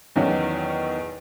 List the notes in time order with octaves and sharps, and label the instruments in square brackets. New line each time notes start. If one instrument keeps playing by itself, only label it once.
[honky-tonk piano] E2 D#3 F#3 C#4 F#4